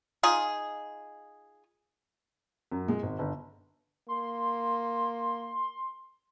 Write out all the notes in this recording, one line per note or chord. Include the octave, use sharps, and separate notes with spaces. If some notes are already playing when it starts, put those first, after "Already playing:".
D#4 F4 G#4
F#2
G#3
G#1
G1
A#3 C6